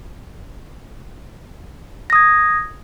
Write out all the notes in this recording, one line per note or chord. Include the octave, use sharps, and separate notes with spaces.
D#6 G#6 A#6